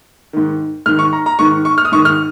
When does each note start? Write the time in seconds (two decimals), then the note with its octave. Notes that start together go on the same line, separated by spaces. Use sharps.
0.33 G#2 D#3
0.86 G#2 D#3 F6
0.99 C#6
1.13 A#5
1.26 A#5
1.39 G#2 D#3 C#6
1.65 C#6
1.78 F6
1.85 D#6
1.92 G#2 D#3 C#6
2.05 F6